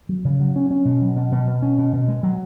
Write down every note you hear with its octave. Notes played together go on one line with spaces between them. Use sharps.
F#3
C#3
F#3
C#4
C#4
B2
F#3
B2
B2
B2
C#4
B2
B2
G#3
F#3